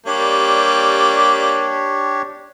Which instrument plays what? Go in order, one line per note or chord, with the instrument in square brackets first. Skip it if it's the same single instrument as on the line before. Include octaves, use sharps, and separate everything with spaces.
[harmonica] G3 A#3 [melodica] D4 G4 C#5